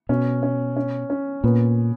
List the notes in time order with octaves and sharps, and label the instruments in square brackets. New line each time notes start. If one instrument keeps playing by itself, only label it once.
[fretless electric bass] B2 [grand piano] C#4
[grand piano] C#4
C#4
C#4
[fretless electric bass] A#2 [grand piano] B3